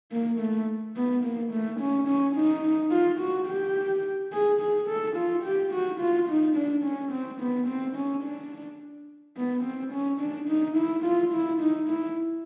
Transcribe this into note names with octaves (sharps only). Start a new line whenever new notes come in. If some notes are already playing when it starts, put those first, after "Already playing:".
A#3
A3
B3
A#3
A3
C#4
C#4
D#4
F4
F#4
G4
G#4
G#4
A4
F4
G4
F#4
F4
D#4
D4
C#4
C4
B3
C4
C#4
D4
B3
C4
C#4
D4
D#4
E4
F4
E4
D#4
E4